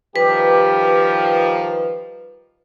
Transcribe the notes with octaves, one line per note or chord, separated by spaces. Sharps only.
D#3 F3 G3 G4 B4